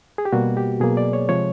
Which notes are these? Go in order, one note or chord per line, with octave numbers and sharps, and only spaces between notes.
G#4
G4
B2 G3 A#3 F#4
G4
B2 F#3 A#3 G#4
D5
C#5
C3 F3 G#3 C#5